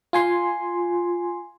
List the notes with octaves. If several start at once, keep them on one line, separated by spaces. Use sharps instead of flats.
F4 G#5 C6